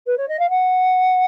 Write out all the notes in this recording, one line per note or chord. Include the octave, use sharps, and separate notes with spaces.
B4
C#5
D#5
F5
F#5